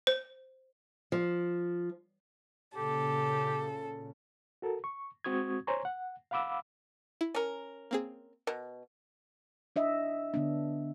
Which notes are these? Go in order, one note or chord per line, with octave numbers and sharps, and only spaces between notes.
C5
F3
A#2 C#3 G4 A4
F#4 A4 A#4
C#6
G#3 C4 F#4 C#6 D#6 G#6
C5 C#5 G#5 A#5 C6 C#6
F#5
F5 F#5 B5 D6 E6
E4
C#4 A#4
A#3 C4 G#4
B2 A#4
D4 D#5 E5
D3 B3 D4